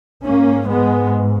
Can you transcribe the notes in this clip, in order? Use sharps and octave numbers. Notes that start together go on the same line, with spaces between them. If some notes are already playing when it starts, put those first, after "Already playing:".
G#2 A#3 C#4
G#3 B3